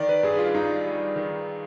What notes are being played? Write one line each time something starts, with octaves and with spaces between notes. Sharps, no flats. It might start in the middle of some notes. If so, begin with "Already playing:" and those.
Already playing: D#3 D5
B4
G2 G#4
F4
G2 D#4
G3
D#3